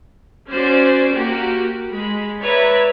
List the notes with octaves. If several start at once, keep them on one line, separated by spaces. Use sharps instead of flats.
C#4 F#4 C5 D5
A#3 F#4 G4
G#3 B5
B4 C#5 D5 E5 A#5